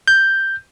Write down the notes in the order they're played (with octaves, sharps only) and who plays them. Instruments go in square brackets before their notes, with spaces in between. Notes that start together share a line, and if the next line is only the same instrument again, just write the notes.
[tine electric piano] G6